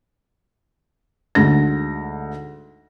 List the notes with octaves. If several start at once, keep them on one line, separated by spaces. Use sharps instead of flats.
D2 G#2 A#6